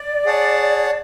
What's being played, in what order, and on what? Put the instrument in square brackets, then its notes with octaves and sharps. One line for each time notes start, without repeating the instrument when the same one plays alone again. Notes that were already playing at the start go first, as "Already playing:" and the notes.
Already playing: [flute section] D5
[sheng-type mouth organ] G#4 C#5 F#5 A5